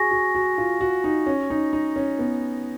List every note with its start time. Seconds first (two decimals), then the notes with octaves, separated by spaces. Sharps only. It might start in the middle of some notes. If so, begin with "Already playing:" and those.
Already playing: F#4 G#4 G#5 C#6 A#6
0.11 F#4
0.35 F#4
0.58 F4
0.81 F#4
1.04 D#4
1.26 C#4
1.50 D#4
1.73 D#4
1.96 C#4
2.19 B3